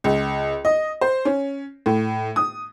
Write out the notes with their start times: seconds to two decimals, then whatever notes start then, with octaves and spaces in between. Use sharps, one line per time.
0.04 C#2
0.65 D#5
1.01 C5
1.25 C#4
1.86 A2
2.36 D#6